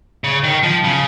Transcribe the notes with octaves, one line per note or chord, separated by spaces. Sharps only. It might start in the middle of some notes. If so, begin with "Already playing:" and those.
C#3
D#3
F3
C#3